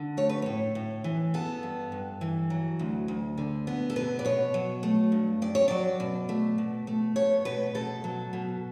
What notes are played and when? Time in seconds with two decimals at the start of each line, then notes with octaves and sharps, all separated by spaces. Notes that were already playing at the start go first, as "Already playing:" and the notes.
Already playing: D3
0.17 A3 C#5
0.29 B4
0.42 A2 C#5
0.75 A2
1.04 E3
1.34 B3 A4
1.63 G2
1.92 G2
2.21 E3
2.50 F#3
2.79 D2
3.08 D2
3.38 D3
3.67 B3
3.90 A4
3.96 B2 B4
4.19 D5
4.25 B2 C#5
4.54 F#3
4.83 A3
5.12 G2
5.42 G2 D5
5.55 C#5
5.68 F#3 D5
6.00 B2
6.29 A3
6.58 B2
6.87 A3
7.16 B3 C#5
7.45 B2 B4
7.75 B2 A4
8.04 F#3
8.33 B2